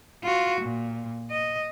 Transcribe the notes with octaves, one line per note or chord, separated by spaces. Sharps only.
F4 F#4
A#2
D#5